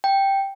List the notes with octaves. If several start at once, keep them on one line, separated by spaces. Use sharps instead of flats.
G5